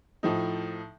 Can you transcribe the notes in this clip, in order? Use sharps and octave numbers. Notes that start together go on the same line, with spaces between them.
A2 F3 D#4